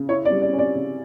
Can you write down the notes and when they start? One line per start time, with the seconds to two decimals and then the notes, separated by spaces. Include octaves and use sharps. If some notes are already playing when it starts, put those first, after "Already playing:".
Already playing: C#3
0.09 E4 C#5
0.25 D5
0.31 G3
0.42 D5
0.53 C#4
0.59 D5
0.75 C#3